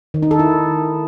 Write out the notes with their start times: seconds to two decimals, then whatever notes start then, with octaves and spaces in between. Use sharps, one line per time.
0.14 D#3
0.23 D#4
0.31 A4
0.39 E4